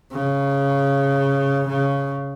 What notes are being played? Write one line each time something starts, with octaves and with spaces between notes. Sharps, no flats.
C#3
C#3